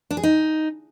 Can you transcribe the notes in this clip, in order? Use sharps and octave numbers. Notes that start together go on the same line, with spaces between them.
D4
G#4
D#4